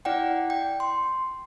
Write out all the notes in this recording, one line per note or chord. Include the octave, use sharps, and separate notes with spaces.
E4 D5 F#5 G5
G5
C6